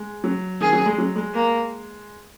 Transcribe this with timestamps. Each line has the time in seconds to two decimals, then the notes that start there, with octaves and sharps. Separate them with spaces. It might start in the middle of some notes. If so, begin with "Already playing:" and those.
Already playing: G#3
0.24 F#3
0.61 D#3 G#4
0.73 F#3
0.86 G#3
0.98 F#3
1.16 G#3
1.34 A#3